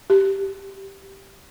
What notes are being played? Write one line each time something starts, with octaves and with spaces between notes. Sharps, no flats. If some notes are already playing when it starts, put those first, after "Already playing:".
G4